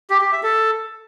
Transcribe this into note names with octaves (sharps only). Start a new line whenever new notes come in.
G4
G4
E5
A4